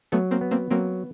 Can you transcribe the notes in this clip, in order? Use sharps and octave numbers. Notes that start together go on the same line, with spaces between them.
F#3 A3 B3
A#3 C4
B3
A#3 C4
F#3 A#3 C4